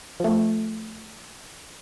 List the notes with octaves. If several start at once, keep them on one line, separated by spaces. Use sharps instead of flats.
F3 A3